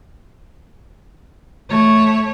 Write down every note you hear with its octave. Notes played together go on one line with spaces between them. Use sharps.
A3 C#5